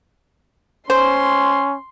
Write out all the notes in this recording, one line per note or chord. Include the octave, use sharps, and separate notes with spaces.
C#4 C5 C6